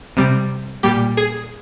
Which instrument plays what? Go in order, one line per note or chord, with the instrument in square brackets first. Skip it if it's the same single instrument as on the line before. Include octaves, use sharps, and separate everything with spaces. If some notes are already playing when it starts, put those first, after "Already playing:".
[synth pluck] C3 G3
A#2 G3 G4
G#4